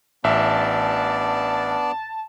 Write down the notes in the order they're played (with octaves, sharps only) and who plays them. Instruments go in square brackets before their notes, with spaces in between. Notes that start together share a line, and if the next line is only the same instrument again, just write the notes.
[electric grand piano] A1 E5 [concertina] B3 D4 D5 [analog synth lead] A5